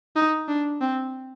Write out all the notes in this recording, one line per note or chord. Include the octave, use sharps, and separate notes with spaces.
D#4
D4
C4